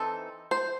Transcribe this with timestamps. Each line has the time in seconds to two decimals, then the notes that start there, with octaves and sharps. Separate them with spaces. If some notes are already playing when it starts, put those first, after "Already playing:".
Already playing: E3 C4 D#4 A4
0.51 C5